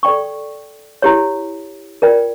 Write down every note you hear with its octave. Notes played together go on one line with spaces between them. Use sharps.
A4 D5 G5 C#6
E4 G4 C#5
F4 A#4 D5 G5